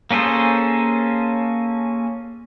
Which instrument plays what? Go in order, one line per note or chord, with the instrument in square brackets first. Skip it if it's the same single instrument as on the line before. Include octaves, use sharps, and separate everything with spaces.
[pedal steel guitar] A#3 C#4 G#4 A4 C5